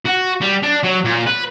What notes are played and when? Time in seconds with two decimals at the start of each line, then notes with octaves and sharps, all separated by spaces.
0.05 F#4
0.41 G3
0.63 D4
0.83 F#3
1.04 A#2
1.26 B4